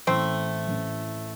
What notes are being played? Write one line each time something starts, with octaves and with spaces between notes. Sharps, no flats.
A1 A2 E3 A3 C4
A1 A2 E3